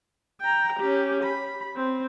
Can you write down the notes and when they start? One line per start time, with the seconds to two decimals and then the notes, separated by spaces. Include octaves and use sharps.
0.41 G5 A#5
0.79 C#4 G4
1.23 B5
1.76 C4